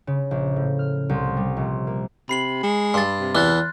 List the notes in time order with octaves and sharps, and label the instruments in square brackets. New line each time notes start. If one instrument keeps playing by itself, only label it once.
[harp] C#3
A#1
A2
F6
C2
G3
A#1
A#3
[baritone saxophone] C3 [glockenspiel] B5 C7 F#7
[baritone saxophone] G#3
[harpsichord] G2 [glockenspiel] C6 A6
[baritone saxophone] C3
[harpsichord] E2 E3 [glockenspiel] F6 F#6 A6